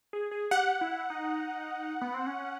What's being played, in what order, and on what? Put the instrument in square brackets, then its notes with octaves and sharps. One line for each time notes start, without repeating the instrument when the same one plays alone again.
[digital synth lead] G#4
G#4
[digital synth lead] G4 [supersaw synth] F#5
[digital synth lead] E4
D#4
B3
C4
C#4